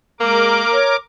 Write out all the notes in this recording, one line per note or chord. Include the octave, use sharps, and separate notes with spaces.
G#3 A#3 A#4 D6
C#5